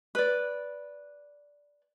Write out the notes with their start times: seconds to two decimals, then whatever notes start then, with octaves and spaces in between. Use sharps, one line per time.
0.15 B4 D5